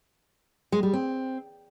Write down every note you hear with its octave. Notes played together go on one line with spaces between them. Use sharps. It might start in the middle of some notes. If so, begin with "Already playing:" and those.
G#3
G3
C4